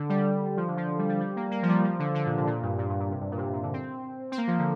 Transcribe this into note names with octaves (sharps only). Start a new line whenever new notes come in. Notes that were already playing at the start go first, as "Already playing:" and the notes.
Already playing: D3
G3
F3
D3
F3
G3
G3
G3
A#3
A#3
F3
G3
F3
D3
D3
A#2
C3
A#2
G2
A#2
G2
A#2
C3
G2
A#2
C3
A#2
A#2
D3
C4
C4
A#3
F3
D3